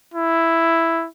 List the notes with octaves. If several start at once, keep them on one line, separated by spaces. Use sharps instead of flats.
E4